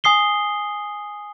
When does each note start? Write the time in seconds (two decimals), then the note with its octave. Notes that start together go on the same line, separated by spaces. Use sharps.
0.04 G#5 D#6 C7 G7